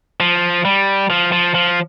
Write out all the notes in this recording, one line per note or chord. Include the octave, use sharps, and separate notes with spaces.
F3
G3
F3
F3
F3